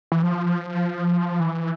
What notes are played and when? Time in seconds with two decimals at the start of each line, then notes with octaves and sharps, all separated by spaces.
0.12 E3
0.23 F3
1.40 E3